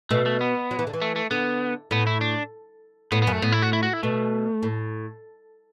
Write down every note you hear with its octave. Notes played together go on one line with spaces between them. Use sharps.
B2 A3
A3
B3
F#3
E3
D3
E3
A3
A3
D3 B3
A2 B3
E4
D4
A2 B3
B3
F#2
A3
A2 B3
E4
F#4
E4
F#4
E4
B2 A3
A2